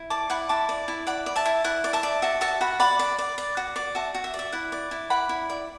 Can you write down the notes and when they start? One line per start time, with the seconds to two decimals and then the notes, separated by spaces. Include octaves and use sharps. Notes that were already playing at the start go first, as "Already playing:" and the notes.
Already playing: E4
0.10 D5 A5 D6
0.30 E4 F#5 B5
0.49 E4 A5 D6
0.69 D5
0.88 E4
1.07 D5 F#5 B5
1.26 D5
1.36 E5 A5
1.46 E4
1.64 E4 F#5
1.84 D5
1.93 E5 A5
2.03 D5
2.22 F#4 E5 A5
2.41 F#4 E5 A5
2.61 F#4 F#5 B5
2.80 D5 F#5 B5
2.99 D5
3.18 D5
3.38 D5
3.57 F#4
3.76 D5
3.95 F#4 E5 A5
4.15 F#4
4.24 E5
4.34 D5
4.39 E5
4.52 E4 F#5
4.72 D5
4.91 E4
5.10 D5 F#5 B5
5.29 E4
5.50 D5